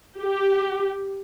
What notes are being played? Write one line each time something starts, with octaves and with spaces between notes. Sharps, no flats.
G4